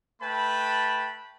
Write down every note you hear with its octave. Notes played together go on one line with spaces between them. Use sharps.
A3 B4 G5 A5 B5